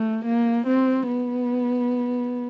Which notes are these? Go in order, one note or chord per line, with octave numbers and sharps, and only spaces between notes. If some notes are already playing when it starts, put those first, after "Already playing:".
Already playing: A3
A#3
C4
B3